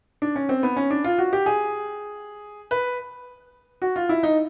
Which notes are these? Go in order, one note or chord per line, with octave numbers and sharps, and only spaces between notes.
D4
C#4
C4
B3
C#4
D4
F4
F#4
G4
G#4
B4
F#4
F4
E4
D#4